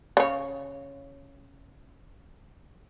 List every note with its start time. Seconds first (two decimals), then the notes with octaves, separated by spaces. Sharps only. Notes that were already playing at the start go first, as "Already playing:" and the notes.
0.17 C#3 C#5